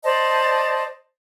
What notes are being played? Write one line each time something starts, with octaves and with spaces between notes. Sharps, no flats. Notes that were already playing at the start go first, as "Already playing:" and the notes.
C5 D5 D#5 A5